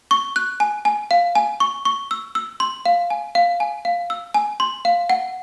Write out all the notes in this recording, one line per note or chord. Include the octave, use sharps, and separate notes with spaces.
C#6
F#6
G#5
G#5
F5
G#5
C#6
C#6
E6
E6
C6
F5
G#5
F5
G#5
F5
E6
G#5
C6
F5
F#5